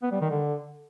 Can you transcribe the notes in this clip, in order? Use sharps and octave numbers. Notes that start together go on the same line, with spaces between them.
B3
G3
D#3
D3